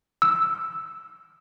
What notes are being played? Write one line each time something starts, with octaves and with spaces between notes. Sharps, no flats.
E6